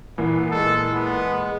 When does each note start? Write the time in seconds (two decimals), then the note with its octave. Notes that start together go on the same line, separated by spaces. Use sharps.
0.18 A#2 E3 B3
0.51 G#3 A4
0.95 B3